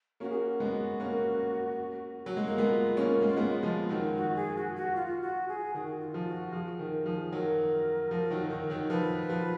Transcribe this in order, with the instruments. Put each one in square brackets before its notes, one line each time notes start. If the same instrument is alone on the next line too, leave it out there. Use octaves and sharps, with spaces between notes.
[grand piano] A#3 C#4 [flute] F#4
[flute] G#4
F#4
[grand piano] G#3 B3
A#3 C#4
F#3
G#3
A#3
[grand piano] G#3 B3 [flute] F4
[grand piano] A#3 C#4
G#3
A#3
G#3 B3
F3 G#3
D#3 F#3
[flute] F#4
G#4
F#4
F#4
F4
F#4
G#4
[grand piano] D#3 [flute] F#4
[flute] F4
[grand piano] F3
[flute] F#4
[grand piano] F3 [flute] G#4
[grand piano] D#3 [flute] A#4
[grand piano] F3 [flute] G#4
[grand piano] D#3 F#3 [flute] A#4
[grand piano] F3
D#3 F#3
D#3
D#3 F#3
[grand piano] F3 [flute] B4
[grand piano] F3